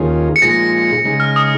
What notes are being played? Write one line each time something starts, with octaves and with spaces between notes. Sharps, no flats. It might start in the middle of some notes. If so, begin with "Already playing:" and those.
Already playing: D#2 D#3 C#4 F4 G#4
C#7
A#2 F3 G#3 D#4 G#4 A#6
C#3 G#3 D#4 G#4
F6
D#6